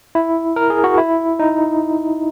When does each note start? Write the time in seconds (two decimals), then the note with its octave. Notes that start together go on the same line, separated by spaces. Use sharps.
0.15 E4
0.56 A#4
0.70 G#4
0.84 F#4
0.98 E4
1.39 D#4